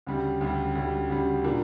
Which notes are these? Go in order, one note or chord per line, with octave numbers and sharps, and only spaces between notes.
D2 C#3 G3
D2 C#3 G3
D2 C#3 G3
D2 C#3 G3
A#2 A#3 D4